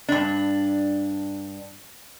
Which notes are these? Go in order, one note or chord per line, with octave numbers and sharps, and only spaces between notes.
G2 D4